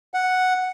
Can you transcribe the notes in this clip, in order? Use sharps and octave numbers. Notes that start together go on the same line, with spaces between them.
F#5